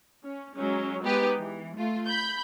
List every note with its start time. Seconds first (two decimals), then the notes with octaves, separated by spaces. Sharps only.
0.24 C#4
0.55 F#3 G#3 C#4
1.02 G#3 B3 D#4 G4 B4
1.37 E3
1.77 A3 F4
2.07 B5 G6